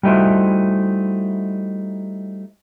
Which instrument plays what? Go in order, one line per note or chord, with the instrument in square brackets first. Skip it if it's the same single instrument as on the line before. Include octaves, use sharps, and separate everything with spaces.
[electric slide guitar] G3 A3 D#4 E4 F#4 C5